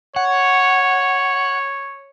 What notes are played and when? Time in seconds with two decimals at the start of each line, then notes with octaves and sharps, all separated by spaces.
0.16 C#5 F#5